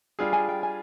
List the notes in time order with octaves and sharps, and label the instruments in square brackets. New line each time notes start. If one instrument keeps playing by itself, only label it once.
[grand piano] G3 D4 F4 G#4
[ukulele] G#5
G5
G#5